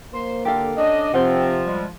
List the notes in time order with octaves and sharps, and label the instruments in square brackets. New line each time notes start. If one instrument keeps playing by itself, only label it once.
[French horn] A#3 [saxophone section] C5
[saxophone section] D3 [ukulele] G4 A4 F5
[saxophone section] C#4 D4 [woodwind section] D#5
[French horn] C3 [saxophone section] F3 [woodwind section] C4 [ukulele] C5 F#5
[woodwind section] G3 G#3